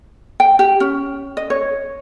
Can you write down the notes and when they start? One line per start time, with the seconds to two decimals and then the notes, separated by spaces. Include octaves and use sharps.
0.40 G5
0.59 G4
0.80 C#4
1.37 D#5
1.50 C#5